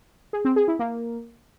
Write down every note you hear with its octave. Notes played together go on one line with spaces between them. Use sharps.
G#4
C4
G#4
E4
A#3